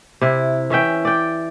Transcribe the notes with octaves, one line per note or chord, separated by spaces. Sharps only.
C3 E4
E3 C#4 E5 G5
D5 G5